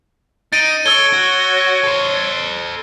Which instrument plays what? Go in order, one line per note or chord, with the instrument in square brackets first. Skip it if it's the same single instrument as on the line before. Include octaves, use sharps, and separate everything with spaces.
[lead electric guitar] D#4 [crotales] A6 D7 D#7
[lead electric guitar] A4 [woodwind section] C#5 [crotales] E6 G#6 G7
[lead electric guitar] F#4
A4 C5